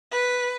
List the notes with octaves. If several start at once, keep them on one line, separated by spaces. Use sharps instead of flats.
B4